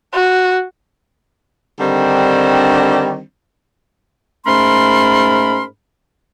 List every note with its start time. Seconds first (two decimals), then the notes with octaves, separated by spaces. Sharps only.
0.13 F#4
1.79 D3 D#3 G3 C4 D4
4.46 G#2 A3 C#4 A#4 B5 C6